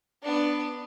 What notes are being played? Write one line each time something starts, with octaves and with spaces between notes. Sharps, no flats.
B3 D4